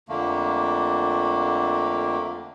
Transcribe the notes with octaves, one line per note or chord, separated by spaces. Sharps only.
F2 D3 A3 A#3